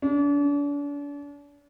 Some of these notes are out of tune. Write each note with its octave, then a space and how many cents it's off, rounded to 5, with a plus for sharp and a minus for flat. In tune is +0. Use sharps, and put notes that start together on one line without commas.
D4 -40